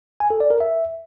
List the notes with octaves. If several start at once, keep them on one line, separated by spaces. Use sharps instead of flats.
G#5
A4
D5
A#4
E5